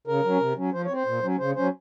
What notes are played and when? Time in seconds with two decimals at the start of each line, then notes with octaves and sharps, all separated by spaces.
0.07 C#3 A#4
0.24 F#3 C#4
0.40 C3
0.57 F#3 C#4
0.73 F3 C5
0.85 C#5
0.90 C4
0.96 C5
1.06 A#2
1.23 F#3 C#4
1.39 C#3 C5
1.56 F#3 C#4 C5